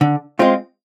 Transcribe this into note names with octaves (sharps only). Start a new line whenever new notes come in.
D3
G#3 C4 F4